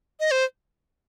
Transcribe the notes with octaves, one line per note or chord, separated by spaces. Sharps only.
D#5
C5